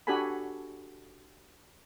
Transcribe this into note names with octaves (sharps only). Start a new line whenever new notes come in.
D4 F#4 G4 A4 G#5 B5